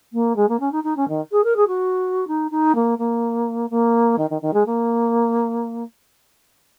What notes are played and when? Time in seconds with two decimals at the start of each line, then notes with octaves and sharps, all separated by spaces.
0.12 A#3
0.36 G#3
0.48 A#3
0.59 C#4
0.71 D#4
0.83 D#4
0.96 C#4
1.08 D#3
1.31 G#4
1.43 A#4
1.56 G#4
1.67 F#4
2.27 D#4
2.51 D#4
2.75 A#3
2.98 A#3
3.70 A#3
4.18 D#3
4.30 D#3
4.41 D#3
4.53 G#3
4.66 A#3